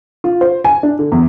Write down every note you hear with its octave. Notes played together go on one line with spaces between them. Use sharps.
F4
C5
G#5
D4
D3
E2